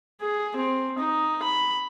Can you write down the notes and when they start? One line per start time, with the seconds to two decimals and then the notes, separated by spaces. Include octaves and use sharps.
0.21 G#4
0.56 C4
0.98 D#4
1.43 B5